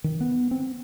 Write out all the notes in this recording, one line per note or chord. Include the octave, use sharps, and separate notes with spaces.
D#3
B3
C4